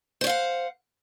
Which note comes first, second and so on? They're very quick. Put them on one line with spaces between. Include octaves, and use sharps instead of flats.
C5 C#5 F5 F#5